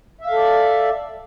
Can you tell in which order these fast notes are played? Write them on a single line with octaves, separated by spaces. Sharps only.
E5 F5 A4 D5